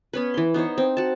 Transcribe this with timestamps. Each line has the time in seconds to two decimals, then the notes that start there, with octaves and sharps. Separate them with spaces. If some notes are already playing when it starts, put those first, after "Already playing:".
0.13 B3 C#4 B4
0.34 E3 C6
0.54 B3 D#4 C5 C#5
0.78 C4
0.97 F#4 A5